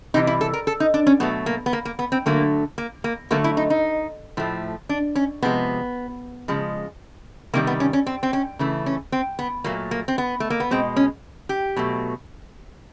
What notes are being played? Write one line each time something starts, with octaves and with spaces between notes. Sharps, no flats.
C3 E3 G3 D#4
E4
A4
A#4
A4
D#4
D4
C#4
B2 F#3 A3 B3
A#3
B3
A#3
A#3
B3
C4
D3 F#3 A3 A#3
A#3
A#3
D3 F#3 A3 A#3
E4
D#4
D#4
A2 F3 A3
D4
C#4
C3 F3 G#3 B3
C#3 F3 G#3
C3 D#3 G3 A#3
B3
C#4
C#4
C4
C4
C#4
C#3 E3 A3
C#4
C4
B3
A#2 F#3 A3 A#3
A#3
C4
B3
A3
A#3
B3
B2 G#3 C4
C#4
G4
B2 F#3 A3